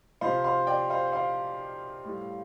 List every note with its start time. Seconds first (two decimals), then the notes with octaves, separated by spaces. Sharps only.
0.21 C3 F3 C5 F5
0.44 C5 F5
0.67 D5 G5
0.90 C5 F5
1.13 C5 F5
2.04 A2 G3